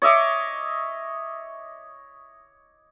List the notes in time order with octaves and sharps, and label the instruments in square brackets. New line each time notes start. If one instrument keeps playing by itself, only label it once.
[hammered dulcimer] C#5 D#5 E5 D6